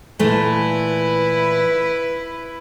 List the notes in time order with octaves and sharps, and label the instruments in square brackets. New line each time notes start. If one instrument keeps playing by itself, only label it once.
[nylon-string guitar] A#2 E3 A3 [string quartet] E4 B4